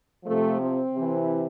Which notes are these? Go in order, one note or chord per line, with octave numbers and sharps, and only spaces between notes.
C3 F3 A3
C4
C3 E3